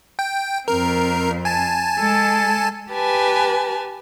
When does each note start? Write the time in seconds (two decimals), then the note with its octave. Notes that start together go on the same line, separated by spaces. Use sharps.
0.19 G5
0.68 F2 C4 A#4
1.45 G#5 A5
1.98 G#3 A4
2.92 G4 B4 G#5 A5